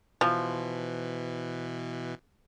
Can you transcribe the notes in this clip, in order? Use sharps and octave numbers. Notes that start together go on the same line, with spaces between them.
B2 E3 F3